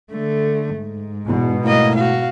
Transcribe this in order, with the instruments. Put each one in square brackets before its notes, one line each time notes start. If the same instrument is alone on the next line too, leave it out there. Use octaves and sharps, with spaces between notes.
[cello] D3 A3
G#2
[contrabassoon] E2 [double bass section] B2
[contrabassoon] A2 [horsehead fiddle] A#3 D#5
[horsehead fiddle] F#4 F5